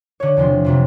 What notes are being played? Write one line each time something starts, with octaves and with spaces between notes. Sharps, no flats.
D3 C#5
E2 C3 F3 C6
F2 C3 F#3